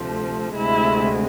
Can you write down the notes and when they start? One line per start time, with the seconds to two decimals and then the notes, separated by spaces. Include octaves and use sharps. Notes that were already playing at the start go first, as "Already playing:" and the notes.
Already playing: D2 C3 F3 A3
0.54 D2 C3 G#3 E4